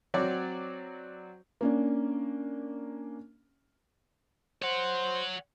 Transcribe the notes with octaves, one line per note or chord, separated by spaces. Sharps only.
F#3 C4 F#4 C#5 D5
A#3 C#4 D4
C5 C#5 F#5